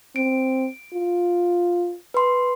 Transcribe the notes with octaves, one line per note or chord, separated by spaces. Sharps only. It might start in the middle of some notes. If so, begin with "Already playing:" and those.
C4 D7
F4
B4 C6